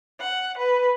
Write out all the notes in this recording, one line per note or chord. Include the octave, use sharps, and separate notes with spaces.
F#5
B4